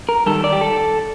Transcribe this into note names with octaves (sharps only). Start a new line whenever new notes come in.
A#4
D#3 G3 A4
D5
G4
A4